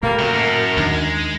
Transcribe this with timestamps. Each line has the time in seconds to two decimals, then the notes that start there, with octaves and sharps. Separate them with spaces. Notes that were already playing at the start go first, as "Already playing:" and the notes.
0.03 A#2 G3 A3 A#3 A#4
0.19 F#2 C#3
0.33 A2
0.77 D#2 D#3 G#3 D4